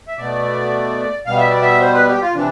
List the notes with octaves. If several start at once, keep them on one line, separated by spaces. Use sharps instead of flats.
E5
B2 A3 D5
B2 G3 F5
E5
D5
E5
C5
B4
G4
F4
C3 E3 D4